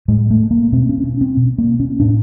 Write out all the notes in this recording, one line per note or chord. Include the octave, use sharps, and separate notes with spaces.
A2 G#3
A3
A#3
B2 C4
C#4
C#4
C4
B2
A#3
C#4
A2 D4